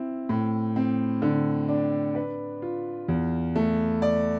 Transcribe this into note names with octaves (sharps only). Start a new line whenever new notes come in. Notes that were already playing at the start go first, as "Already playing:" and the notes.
Already playing: C4 E4
A2
C4
D3
D4
B4
F4
E2
A3
D5